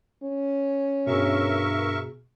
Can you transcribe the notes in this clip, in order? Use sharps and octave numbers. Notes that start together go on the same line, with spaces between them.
C#4
G2 B2 G#4 A#4 E5 C#6